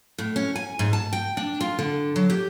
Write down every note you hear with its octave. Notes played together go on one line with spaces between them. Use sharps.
A2
C#4
G#5
G#2
A5
G5
D4
F4
D3
F#3
G4